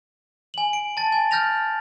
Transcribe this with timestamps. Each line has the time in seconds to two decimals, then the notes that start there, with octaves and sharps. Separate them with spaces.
0.54 G#5 F#7
0.73 D7
0.97 A5 A6
1.12 G#5
1.31 F6 G6 A6 A#6 F7